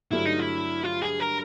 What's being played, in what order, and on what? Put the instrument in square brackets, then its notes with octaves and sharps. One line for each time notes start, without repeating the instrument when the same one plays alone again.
[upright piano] G2 D3 F#3 A3 [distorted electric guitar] E4
[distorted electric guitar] D#4
E4
F4
G#4
A#4